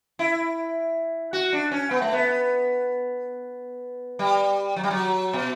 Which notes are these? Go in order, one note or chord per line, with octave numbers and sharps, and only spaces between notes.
E4
F#4
D4
C#4
B3
A3
B3
G3
F#3
G3
F#3
B2